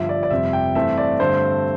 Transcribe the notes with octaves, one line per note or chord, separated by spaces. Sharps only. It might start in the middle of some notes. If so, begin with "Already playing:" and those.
Already playing: G1 G2 F3 E5
D5
D5
F1 F2 C3 G3 C4 E5
G5
G2 E3 A3 C4 E5
D5
G2 D3 A3 C4 C5